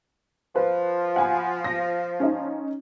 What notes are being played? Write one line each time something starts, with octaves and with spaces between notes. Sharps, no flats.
F3 B4
F#5 G#5 B5
A#6
C#4 D#4